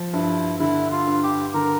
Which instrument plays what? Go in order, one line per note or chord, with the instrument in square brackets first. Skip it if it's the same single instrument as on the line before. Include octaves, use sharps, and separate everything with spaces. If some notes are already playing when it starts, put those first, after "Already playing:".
Already playing: [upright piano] F3
[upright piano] G2 [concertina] E4
[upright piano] D3 [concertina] E4
[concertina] F4
[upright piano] G2
[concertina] G4
[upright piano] D3 [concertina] A#4